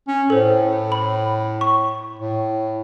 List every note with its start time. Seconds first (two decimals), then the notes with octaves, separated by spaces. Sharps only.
0.08 C#4
0.30 A2 A4 C5
0.92 B5
1.61 C#6
2.19 A2